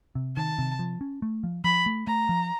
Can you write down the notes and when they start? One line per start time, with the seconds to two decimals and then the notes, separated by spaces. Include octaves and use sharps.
0.15 C3
0.37 D#3 A5
0.58 C3
0.79 F3
1.01 C#4
1.22 A3
1.43 F3
1.64 F3 B5
1.86 A3
2.07 A3 A#5
2.29 F3